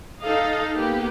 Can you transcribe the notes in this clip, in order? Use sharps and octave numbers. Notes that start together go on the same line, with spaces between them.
D#4 A4 D#5 F5
A#3 B3 G4